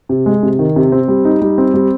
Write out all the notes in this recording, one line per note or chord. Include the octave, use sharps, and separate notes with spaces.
C3
G#3
C3
D#3
C3
C4
G3
D#4
G3
C4
G3